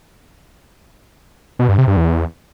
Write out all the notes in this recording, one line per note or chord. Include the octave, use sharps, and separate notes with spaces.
B2
G2
C3
G2
E2